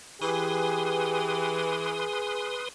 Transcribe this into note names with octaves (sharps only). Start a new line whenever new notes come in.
E3 G4 G#4 B4 C6 D#6